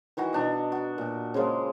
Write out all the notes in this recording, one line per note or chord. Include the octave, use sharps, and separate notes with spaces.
D#3 E3 F#4 A#5
B2 D4 D#5
F#4
A#2
C#3 F3 G#3 A#3